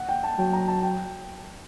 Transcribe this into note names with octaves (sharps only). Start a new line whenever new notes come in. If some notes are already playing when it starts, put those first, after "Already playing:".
Already playing: F#5
G5
A5
F#3 G5
A#5
A5
G5